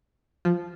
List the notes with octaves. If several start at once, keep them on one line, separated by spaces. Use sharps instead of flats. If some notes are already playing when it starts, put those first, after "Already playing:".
F3